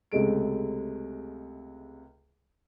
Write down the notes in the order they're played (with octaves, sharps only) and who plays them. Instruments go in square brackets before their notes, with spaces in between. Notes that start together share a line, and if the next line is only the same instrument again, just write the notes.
[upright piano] C#2 C3 G#3 A3 D7